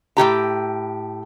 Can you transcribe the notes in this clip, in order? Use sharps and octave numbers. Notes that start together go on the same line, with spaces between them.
A2 F3 G4 A#5